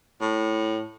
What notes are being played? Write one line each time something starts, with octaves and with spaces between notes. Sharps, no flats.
A2